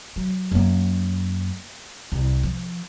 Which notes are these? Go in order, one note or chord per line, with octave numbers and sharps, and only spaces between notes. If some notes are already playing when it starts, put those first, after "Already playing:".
F#3
F#2 A#3
C2
F3